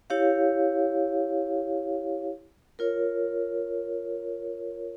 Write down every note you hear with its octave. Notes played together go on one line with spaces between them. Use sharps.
E4 G4 C#5 F5
F4 A#4 C#5